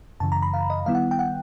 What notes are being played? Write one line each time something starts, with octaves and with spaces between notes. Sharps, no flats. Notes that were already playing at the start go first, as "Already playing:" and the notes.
F#2 C#3 E3 A5
A#5
B5
F5
D#5
D#3 G3 B3 E4 F5
F#5
G5
F#5